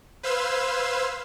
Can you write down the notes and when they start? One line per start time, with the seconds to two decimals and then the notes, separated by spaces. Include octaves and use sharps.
0.23 B4 C5 F5 C6 E6 G#6